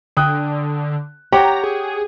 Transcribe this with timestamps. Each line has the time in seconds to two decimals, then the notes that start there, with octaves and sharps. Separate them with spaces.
0.17 D3 G5 D#6 F#6
1.32 G4 C#5 F#5 G5 A#5
1.64 G#4